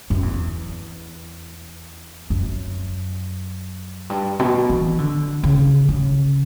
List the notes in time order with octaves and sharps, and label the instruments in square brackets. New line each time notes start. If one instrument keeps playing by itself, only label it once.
[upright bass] F#2
E2
F#2
G2
B2
E3
D3
C#3
C#3